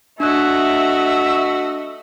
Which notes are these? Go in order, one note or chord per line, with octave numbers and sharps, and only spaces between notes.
A3 D4 F#4 D#5 E5 F#6